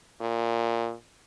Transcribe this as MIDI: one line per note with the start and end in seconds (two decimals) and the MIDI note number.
0.21 0.94 46